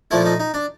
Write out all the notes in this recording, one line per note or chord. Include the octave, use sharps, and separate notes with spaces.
A#2 F3 A3 E4
D#4
D#4
D4